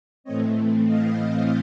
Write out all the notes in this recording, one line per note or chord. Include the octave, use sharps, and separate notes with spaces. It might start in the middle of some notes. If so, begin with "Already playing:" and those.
A2 E3 A3 C4 C#5 D#5
D#5 F5
D#5 F5